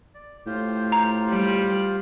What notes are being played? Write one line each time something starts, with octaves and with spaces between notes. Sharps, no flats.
D5
A2 F4 G4 C5
A#5
G3